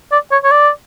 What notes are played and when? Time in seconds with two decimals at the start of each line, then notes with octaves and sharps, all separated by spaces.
0.12 D5
0.32 C#5
0.44 C#5
0.51 D5